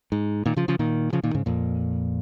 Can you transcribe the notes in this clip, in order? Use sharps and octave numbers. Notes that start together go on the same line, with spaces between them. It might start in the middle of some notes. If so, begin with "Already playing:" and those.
G#2
A#2 D#3
C#3 F3
C#3 F3
A#2 D#3
C#3 F3
A#2 D#3
G#2 C#3
F2 A#2